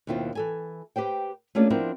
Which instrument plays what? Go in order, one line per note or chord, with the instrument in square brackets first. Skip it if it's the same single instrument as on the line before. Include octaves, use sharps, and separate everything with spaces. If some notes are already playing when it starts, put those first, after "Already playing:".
[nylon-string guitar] D#2 B2 D#3 C4 E4 F4
E3 A4 G#5
G4 B4 C5 G5
A3 A#3 C#4 D4 F4 G#4
F3 B3 C4 D4 E4 A#4